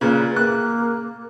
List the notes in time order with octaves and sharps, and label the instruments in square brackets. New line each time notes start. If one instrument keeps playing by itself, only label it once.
[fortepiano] A#2 C#3 [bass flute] B4
[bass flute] A#3 [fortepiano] F#6